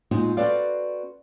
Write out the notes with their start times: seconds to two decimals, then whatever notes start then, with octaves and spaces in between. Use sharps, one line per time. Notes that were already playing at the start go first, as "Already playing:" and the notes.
0.11 A#2 G#3 D#4 F#4 C5
0.37 C4 F#4 A4 B4 D5 F5